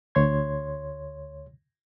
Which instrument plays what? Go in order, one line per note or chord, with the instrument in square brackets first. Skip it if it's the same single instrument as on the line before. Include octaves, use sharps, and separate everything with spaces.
[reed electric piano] D2 C#5 C6 G#6